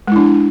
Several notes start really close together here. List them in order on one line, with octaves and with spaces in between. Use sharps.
G#3 E4 D4